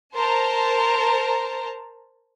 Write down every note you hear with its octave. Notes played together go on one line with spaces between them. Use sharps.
A#4 C5 A5 A#5